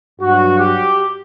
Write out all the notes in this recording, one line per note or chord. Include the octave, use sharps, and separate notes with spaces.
G2 F#3 F#4
G4